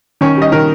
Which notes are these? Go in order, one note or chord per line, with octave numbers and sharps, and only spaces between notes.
D#3 C#4
G3 D#5
D#3 A#4